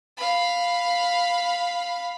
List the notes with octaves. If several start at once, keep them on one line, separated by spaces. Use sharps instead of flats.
F5 B5